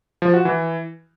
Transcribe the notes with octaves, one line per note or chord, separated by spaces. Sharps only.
F3
F#4
E3